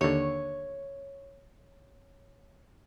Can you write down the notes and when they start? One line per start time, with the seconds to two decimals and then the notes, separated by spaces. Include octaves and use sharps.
0.01 D#2 D3 C#5